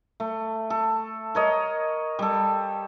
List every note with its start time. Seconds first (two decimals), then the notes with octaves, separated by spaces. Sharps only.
0.20 A3
0.70 A4
1.35 A#4 C#5 D#5
2.19 G3 A4